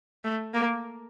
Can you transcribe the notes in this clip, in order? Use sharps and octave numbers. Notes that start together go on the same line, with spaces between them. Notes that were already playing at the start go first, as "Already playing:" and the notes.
A3
A#3